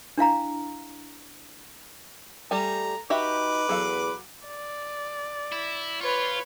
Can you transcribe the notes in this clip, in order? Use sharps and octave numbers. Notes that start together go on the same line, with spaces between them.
D4 E4 F5 A#5
G3 A3 G4 G#5 A#5
D#4 F#4 G4 B4 E5 D6
E2 F#3 A4 F5
D5
E4
F4 B4 C#5